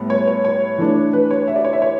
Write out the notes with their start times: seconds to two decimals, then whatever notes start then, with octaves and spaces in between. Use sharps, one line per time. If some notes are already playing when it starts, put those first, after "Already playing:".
Already playing: A2 G3 B3
0.10 C#5
0.27 C#5
0.44 C#5
0.78 E3 A3 D4
1.13 B4
1.31 C#5
1.48 E5
1.56 D5
1.65 C#5
1.73 E5
1.82 C#5